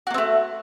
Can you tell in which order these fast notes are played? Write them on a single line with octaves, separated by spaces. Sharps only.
F#4 A#3 C4 A3